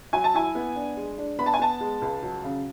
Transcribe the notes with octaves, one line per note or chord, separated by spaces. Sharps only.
F#3 G#5
A5
E4 G#5
B3
D4
G#3
D4
B3 B5
A5
G#5
B3 A5
G#3
C#2
F#3
C#3